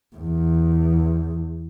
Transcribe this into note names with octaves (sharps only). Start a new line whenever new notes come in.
E2